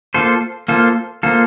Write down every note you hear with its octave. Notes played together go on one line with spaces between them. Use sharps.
A#3 F4 A4 C5
A#3 F4 A4 C5
A#3 F4 A4 C5